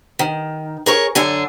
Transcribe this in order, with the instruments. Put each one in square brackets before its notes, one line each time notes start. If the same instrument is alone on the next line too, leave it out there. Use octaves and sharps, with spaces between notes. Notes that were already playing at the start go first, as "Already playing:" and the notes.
[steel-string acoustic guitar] D#3
G#4 A#4 C#5
F#2 D3 D4 G#5